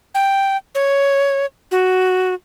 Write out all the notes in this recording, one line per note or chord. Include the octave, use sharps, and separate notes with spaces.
G5
C#5
F#4